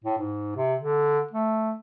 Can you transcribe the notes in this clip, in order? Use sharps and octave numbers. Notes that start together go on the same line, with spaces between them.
A2
G#2
C3
D3
A3